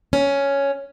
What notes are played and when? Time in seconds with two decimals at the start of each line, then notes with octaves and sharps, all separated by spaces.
0.13 C#4